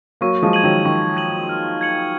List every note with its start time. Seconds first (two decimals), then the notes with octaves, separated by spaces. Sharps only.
0.21 F#3 A#3 C#6
0.42 F3 G#3
0.53 G#6 D#7 F#7
0.64 D#3 F#3
0.85 D#3 C#6
1.17 G#6 D#7 F#7
1.49 F6
1.81 G#6 C#7 F#7